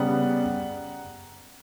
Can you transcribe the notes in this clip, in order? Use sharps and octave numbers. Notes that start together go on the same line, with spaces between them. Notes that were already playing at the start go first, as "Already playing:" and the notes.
Already playing: C#3 G3 B3 F#5 A#5